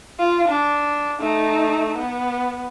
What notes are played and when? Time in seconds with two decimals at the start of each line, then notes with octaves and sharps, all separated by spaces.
0.19 F4
0.49 D4
1.20 A3 D#4
1.98 B3